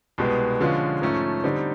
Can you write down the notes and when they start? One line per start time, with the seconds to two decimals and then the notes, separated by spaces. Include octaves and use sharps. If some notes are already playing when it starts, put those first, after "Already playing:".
0.18 C2 B2 G#3 B3
0.60 D3 F3 G#3 C#4 F4
1.02 G#2 F3 A3 C#4
1.44 D3 G3 C4 D#4 G4